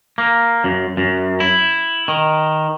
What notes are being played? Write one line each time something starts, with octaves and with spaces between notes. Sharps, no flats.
A#3
F#2
F#2
E4
D#3